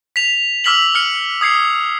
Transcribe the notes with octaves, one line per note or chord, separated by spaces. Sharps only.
B6 F7
D6 E6 F6 B6 F7 F#7
F6 C#7
D#6 G#6 C7 C#7